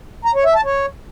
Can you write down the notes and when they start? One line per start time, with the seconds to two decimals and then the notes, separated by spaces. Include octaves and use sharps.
0.25 A#5
0.35 C#5
0.45 E5
0.55 A5
0.64 C#5